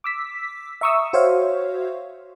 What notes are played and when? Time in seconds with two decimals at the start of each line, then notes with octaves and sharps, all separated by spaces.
0.04 D6 E6 B6
0.81 E5 A#5 C#6 D#6 E6
1.13 F#4 C5 C#5 E5 F5